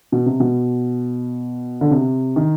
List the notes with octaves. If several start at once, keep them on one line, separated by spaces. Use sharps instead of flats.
B2
C3
B2
D3
C3
D#3